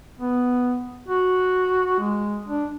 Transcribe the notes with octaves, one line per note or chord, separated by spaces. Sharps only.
B3
F#4
G#3
D4